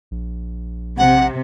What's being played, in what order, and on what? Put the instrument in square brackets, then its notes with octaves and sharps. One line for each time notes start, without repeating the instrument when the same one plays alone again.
[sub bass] A#1
[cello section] C3 [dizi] F#5